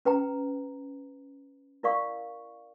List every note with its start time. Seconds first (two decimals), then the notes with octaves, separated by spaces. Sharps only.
0.05 C#4 B4 G5 A#5
1.83 E4 A#4 D5 F5 C#6